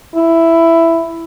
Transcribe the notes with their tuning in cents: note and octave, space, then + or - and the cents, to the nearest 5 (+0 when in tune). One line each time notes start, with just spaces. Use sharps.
E4 +5